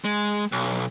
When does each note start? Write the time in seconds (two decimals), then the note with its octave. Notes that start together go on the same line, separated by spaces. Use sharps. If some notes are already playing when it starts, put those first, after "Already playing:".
0.05 G#3
0.52 B1